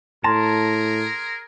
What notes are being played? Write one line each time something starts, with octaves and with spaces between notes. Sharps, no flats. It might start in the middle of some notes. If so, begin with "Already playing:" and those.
A2 G#4 A#4 A5 A#5 C6